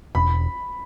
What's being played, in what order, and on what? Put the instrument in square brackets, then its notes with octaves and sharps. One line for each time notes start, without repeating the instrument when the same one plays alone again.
[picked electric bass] E1 [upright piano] B5